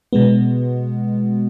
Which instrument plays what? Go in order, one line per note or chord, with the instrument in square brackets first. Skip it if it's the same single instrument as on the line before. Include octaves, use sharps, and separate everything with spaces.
[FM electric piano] B2 G#3 B3